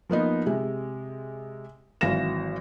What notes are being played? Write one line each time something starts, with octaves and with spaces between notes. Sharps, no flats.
F3 A#3 B3 D#4
C3 G#3
G#1 E3 F#3 F5 A#6 E7